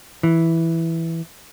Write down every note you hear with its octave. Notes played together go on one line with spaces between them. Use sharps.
E3